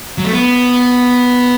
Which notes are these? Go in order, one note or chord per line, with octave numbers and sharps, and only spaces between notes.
F#3
A3
B3